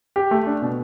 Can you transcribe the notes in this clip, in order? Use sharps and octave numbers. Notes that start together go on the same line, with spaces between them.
G4
A3
D4
B2